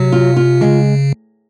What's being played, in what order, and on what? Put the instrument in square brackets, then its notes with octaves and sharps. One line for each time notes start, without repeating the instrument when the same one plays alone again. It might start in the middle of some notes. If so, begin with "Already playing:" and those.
Already playing: [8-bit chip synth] C3 [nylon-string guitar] F#3
[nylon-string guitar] F4
F4
[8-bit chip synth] C#3 [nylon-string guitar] G#3